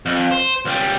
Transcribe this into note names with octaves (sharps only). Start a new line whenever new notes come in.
F2
C5
C#2 G3